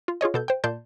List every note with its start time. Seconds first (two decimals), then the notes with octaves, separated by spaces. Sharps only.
0.08 F4
0.21 F4 G#4 C#5 D#5
0.34 B2 A4 G6
0.48 C5 G5
0.64 A#2 D5 A5 C6 G6